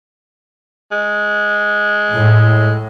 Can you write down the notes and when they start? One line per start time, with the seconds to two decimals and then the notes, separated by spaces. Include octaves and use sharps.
0.91 G#3
2.12 A2